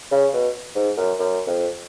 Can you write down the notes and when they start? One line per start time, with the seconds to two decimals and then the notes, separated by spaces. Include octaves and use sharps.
0.11 C#3
0.33 B2
0.75 G#2
0.97 F#2
1.19 F#2
1.47 F2